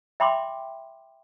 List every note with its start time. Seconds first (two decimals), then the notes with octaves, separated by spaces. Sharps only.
0.20 E5 G5 B5 C6 D6